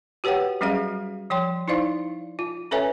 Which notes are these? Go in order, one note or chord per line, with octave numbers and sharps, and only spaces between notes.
F#4 G4 B4 C#5 F#5 G5
F#3 G3 C#4 F#4 G#4 F5
F3 C#5 G5 C6
D#4 E4 C5 D5 F5
F4
C#4 A4 B4 C#5 E5 G#5